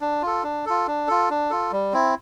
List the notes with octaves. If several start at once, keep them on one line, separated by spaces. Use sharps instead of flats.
D4
F4 A4
D4
F4 A4
D4
F4 A4
D4
F4 A4
G3
C4 E4